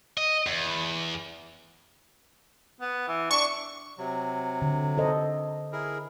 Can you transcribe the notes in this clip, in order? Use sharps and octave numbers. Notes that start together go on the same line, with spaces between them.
D#5
E2
B3
E3
D4 C#6
C3 F#3
D3
A4 C5 D#5
E4 G#4 A#4